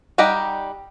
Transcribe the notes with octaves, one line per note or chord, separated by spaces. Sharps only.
G3 D#4 G4 F#5 A#5